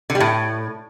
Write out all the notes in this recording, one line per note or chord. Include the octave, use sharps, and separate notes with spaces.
D3
G3
A2